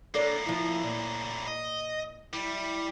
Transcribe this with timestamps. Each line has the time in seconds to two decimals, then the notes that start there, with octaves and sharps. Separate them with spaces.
0.14 A2 A#3 D4 A4 C#5
0.46 F3 E4
0.83 A#2
1.48 D#5
2.33 G3 E4